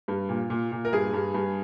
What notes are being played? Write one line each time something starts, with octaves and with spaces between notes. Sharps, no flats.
G2
A#2
A#2
A#2
A#4
G2 G#4
G2
G2